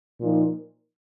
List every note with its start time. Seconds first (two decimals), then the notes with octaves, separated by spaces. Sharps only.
0.21 A#2 F3 A#3 D#4